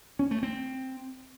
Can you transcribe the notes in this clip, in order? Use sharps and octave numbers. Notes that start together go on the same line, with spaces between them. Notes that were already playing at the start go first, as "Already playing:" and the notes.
C#4
A3
C4